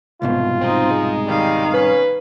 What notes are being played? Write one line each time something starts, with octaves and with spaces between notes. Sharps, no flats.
C2 G#2 B2 F4
C4 D#4
G#3
D#3 G3 F5
C#4 B4